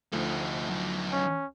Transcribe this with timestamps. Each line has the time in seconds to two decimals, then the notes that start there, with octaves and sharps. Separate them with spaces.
0.13 D2 F3 A3 D#4
0.69 F#3 D#4
1.12 C#4